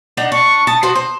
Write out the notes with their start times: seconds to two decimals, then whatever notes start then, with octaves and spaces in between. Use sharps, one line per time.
0.17 D4 D#4 F#5
0.32 D4 C#6
0.67 A5 D#6
0.83 F#4 C5
0.95 C5